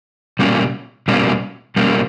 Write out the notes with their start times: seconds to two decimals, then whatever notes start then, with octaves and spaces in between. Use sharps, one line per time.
0.39 B2 G3 A#3 C#4
1.08 B2 G3 A#3 C#4
1.76 B2 G3 A#3 C#4